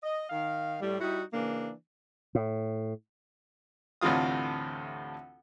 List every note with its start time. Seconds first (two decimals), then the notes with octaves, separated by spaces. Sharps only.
0.03 D#5
0.30 D#3 F5
0.81 A2 G3
1.00 G3 D#4 E4 F#4
1.33 C#3 E3 A#3 D4
2.35 A2
4.01 D2 A2 C3 E3 F4 D#6